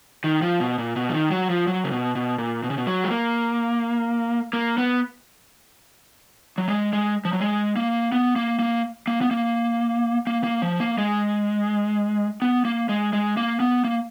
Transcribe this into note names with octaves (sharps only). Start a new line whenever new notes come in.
D#3
F3
B2
A#2
B2
F3
D#3
F#3
F3
F#3
C#3
B2
B2
A#2
B2
C#3
B2
F#3
G#3
A#3
A#3
B3
F#3
G#3
G#3
F3
F#3
G#3
A#3
B3
A#3
A#3
A#3
B3
A#3
A#3
A#3
F3
A#3
G#3
B3
A#3
G#3
G#3
A#3
B3
A#3